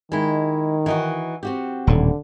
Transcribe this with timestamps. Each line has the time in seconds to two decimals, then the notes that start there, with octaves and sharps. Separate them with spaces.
0.12 D#3 G#3 E4
0.86 E3 D#4 F#4
1.43 C4 F#4 G4
1.87 D#1 A2 D3